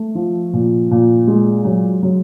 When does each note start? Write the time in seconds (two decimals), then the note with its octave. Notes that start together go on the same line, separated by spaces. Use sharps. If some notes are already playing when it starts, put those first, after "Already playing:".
Already playing: A3
0.15 F3
0.53 A#2
0.91 A#2
1.27 G#3
1.65 F#3
2.03 F#3